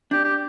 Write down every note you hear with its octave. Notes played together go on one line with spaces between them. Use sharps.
D4 G4
G4